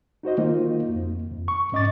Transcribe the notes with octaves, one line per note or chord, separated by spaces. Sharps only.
D#4 F#4 C5 D#5
D#3 A#3 D#4 F4
F2
F2
C#6
G#2 C#4 D#5 C#6 D6 A6